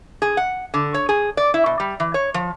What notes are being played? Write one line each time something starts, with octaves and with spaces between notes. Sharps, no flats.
G#4
F#5
D3
C#5
G#4
D5
E4
B2
G3
E3
C#5
F3